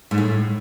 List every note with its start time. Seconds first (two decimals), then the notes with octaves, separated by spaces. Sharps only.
0.11 G#2
0.18 A2